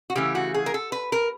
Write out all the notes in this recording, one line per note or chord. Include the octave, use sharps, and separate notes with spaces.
F#4
C#3 E3 A3 G4
F#4
G#4
A#4
A4
B4
A#4